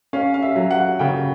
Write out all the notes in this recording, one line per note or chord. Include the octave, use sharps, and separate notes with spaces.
C#4 F5
F5
E5
F#3
F#5
C#3 G5